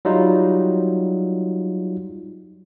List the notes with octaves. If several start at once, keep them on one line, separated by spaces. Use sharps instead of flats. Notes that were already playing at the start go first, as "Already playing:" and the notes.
F#3 G3 D#4 F4